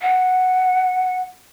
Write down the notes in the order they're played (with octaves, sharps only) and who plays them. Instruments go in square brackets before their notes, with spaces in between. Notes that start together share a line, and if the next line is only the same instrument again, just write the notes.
[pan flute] F#5